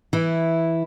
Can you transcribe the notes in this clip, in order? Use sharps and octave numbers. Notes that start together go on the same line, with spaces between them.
E3 E4